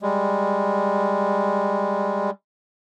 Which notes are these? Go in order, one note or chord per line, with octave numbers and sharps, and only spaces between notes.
G3 G#3